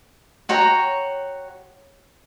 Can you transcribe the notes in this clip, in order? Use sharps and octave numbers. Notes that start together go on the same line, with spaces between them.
F#4 C#5 G5 A#5